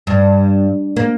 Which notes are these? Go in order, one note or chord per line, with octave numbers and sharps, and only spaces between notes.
G2
A#3